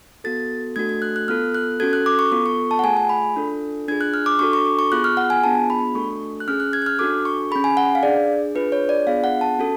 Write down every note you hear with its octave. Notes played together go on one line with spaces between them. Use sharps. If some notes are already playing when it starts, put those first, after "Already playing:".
B3 F#4 A4 A6
A3 D4 F#4 A4 G#6
G#6
F#6
F#6
B3 F4 A4 F6
F#6
C#4 F#4 A4 G#6
F#6
D6
C#6
B3 F4 A4 C#6
C#6
A5
F#5
A3 F4 G#4 G#5
G#5
B5
D4 F4 A4
D4 F4 G#4 G#6
F#6
F6
D6
D4 F#4 A4 C#6
C#6
D6
C#6
B3 F4 G#4 F#6
F6
F#5
G#5
B3 D4 F4 G#4 A5
B5
A3 D4 F#4 A4 C#6
F#6
C#4 G#4 F6
F#6
G#6
F#6
F6
D4 F#4 A4 D6
C#6
C#4 G#4 B5
G#5
F#5
F5
D4 G#4 D5
D4 F4 G#4 B4
C#5
D5
B3 D4 F4 G#4 F5
F#5
A5
C#4 F#4 A4